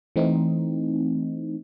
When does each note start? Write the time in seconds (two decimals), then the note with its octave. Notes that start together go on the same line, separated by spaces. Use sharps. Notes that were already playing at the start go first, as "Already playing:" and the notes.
0.16 E3 A3 C4 D#4